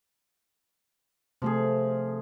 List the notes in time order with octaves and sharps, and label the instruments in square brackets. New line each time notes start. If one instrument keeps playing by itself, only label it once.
[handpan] C3 A3 [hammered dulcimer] F3 G#4